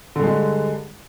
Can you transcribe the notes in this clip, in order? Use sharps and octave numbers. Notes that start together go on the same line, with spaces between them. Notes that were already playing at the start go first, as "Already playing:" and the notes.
G2 D3 G#3